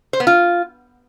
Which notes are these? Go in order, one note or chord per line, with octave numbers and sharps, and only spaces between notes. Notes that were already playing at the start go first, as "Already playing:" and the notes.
C5
B3
F4